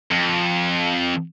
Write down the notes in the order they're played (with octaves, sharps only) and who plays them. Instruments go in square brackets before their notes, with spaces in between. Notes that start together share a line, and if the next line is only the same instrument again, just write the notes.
[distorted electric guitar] F2